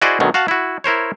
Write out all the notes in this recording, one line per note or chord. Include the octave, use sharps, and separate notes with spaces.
E4 F#4 G#4 C5 D5 D#5
D2 B2 D#3 F#3
F#4 F5 F#5 A5
E4 F#4
E4 A#4 C5 C#5